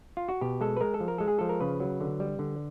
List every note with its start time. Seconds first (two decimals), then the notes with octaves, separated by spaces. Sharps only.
0.17 F4
0.29 F#4
0.41 B2 G4
0.61 G#3 A4
0.77 B4
0.81 G#3 A#4
0.94 A4
1.00 F3
1.08 A#4
1.18 G#3 A4
1.28 G#4
1.39 F3 A4
1.49 A#4
1.61 C#3 B4
1.80 F#3
2.00 D3
2.20 G3
2.39 D3